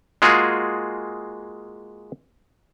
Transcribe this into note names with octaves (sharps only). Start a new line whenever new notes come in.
G#3 A#3 F4 F#4 G#4